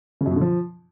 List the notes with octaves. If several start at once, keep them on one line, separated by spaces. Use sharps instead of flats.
C#3
F#2
B2
D3
F3